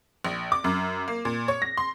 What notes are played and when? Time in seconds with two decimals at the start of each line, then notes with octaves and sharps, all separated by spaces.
0.25 A#1
0.52 D6
0.64 F#2
1.08 A#3
1.25 A#2
1.48 C#5
1.62 A#6
1.77 C6